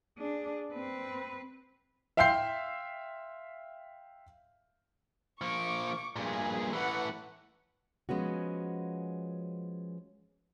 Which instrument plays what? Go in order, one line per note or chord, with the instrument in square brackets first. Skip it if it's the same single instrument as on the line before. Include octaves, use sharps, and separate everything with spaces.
[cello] D4 G#4
C4 B4
[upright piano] E5 F5 G5 C6 G6 C7
[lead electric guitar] F3 A#3 [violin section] C#6 D6
[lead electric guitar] G2 A#2 [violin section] G#4 B4
[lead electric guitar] A2 E3 [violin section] B4 F#5
[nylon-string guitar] F3 G#3 B3 C#4 F#4